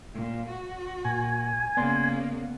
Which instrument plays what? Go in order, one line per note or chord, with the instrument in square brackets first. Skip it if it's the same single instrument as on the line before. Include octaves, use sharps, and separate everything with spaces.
[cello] A#2
F#4
[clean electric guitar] A#2 [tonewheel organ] G#5
[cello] C#3 A#3 [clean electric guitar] B3 D5 C6